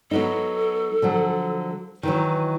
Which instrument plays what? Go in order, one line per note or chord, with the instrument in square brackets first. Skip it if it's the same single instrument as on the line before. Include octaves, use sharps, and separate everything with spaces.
[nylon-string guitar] F#3 B3 D#4 [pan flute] A4
[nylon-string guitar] D3 F3 F#3
[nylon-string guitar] D#3 E3 F#3 [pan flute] B4